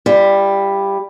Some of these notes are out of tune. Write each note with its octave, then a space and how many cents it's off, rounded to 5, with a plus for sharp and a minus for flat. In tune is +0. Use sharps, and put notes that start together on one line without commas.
G3 +10 F4 -45